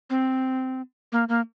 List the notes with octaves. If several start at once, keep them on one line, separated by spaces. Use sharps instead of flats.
C4
A#3
A#3